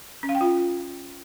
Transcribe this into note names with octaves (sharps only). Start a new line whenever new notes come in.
C#4
F5
G5
F4